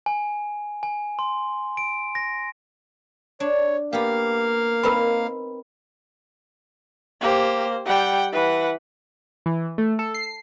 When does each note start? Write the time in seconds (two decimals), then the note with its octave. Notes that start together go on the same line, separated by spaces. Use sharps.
0.06 G#5
0.83 G#5
1.19 C6
1.77 D7
2.15 A#6
3.40 D4 C#5
3.93 A#3 B3 G4 F5
4.83 C4 D#4 A#4 B4 B5
7.21 A#3 G4 C5
7.86 G3 F#5 G5
8.33 E3 B4 F#5
9.46 E3
9.78 A3
9.99 A4
10.14 C7